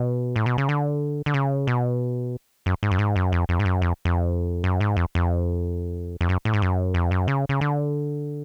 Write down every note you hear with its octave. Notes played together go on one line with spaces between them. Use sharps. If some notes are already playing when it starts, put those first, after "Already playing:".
Already playing: B2
A2
B2
C#3
D3
D3
C#3
B2
F#2
G#2
F#2
G#2
F#2
F2
F2
G#2
F#2
F2
F2
F#2
G#2
F2
F2
F2
F#2
A2
G#2
F#2
F2
F#2
C#3
C#3
D3